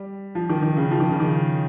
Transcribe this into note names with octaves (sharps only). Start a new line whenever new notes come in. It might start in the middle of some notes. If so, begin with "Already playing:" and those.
Already playing: G3
F3
D#3
D#3
C#3
F3
D#3
C#3
D#3